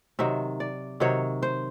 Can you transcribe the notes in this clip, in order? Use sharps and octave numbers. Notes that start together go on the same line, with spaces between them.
C3 D#3 F#3 E5
D5
C3 D#3 F#3 C#5
C5